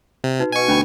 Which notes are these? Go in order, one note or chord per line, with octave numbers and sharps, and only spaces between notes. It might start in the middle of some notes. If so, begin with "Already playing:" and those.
C3
D#4 F#4 B4
B2 G#5 C#6
D2 C#4 D4 B5